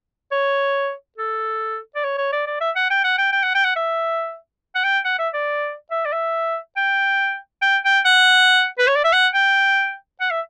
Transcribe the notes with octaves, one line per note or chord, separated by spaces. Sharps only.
C#5
A4
D5
C#5
C#5
D5
D5
E5
F#5
G5
F#5
G5
G5
F#5
G5
F#5
E5
F#5
G5
F#5
E5
D5
E5
D5
E5
G5
G5
G5
F#5
B4
C#5
D5
E5
F#5
G5
F#5
E5